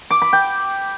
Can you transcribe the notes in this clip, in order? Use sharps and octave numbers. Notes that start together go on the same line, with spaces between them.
D6
B5
G5